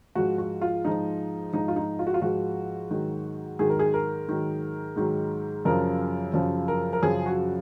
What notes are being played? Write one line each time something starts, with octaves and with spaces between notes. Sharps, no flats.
G#2 F3 F#4
F#4
F4
G#2 F3 D#4
G#2 F3 D#4
F4
D#4
F4
F#4
F4
G#2 F3 F#4
G#2 D#3 F#3
G#2 D#3 F#3 G#4
A#4
G#4
A#4
G#2 D#3 F#3
G#2 D#3 F#3
F#2 C#3 F3 A#4
F#2 C#3 F3
A#4
A#4
F#2 C#3 F3 G#4
F#4